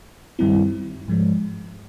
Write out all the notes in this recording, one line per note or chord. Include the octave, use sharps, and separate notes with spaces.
G2 D#3 G3 C4 E4
G#2 F3 G#3